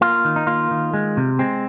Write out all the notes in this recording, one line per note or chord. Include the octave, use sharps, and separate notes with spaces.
A#3 F4
D#3
D#4
A#3 F4
D#3
G#3
C3
G#3 C4